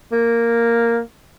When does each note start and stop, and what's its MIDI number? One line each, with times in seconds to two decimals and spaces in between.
0.12 1.00 58